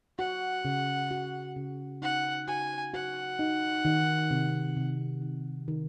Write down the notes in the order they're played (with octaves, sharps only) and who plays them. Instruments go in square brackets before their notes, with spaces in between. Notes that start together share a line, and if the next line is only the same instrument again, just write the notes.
[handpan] F#4 [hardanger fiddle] F#5
[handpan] C#3
F#4
C#3
[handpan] D#4 [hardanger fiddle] F#5
[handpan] F#4 [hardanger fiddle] G#5
[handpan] F#4 [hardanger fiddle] F#5
[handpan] D#4
D#3
C3
C3
D#3
D#3